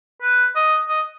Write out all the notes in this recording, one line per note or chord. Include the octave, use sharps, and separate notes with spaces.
B4
D#5
D#5